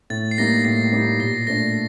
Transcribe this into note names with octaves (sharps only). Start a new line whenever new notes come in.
A2 A6
C7
G3 A#3 D#4 A#6
A2 C7
G3 A#3 D#4
A#2 A#6
C7
A3 D4 A#6